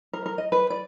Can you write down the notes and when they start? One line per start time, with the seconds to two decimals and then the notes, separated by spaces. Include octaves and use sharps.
0.13 A#4
0.26 A#4
0.38 D#5
0.52 B4
0.70 D5